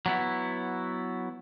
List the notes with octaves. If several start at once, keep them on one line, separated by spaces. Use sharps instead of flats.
F#3 B3 E4